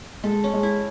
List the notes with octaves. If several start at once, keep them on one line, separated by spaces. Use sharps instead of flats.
G#3 A4
C#4
G#3
E4